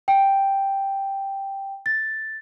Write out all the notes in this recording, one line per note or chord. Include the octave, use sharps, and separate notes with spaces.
G5
A6